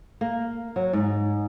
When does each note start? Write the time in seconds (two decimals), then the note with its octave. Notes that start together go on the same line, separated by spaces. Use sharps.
0.21 A#3
0.76 F#3
0.93 G#2